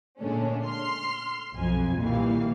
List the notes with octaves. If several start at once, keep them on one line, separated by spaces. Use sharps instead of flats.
A#2 D3 G#3 A3 C#4 D4
C6 F6 C7
B1 F2 G#5
A#2 D#3 E3 G3 A#3 F5